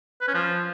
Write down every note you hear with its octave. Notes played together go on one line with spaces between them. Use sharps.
B4
C#4
F3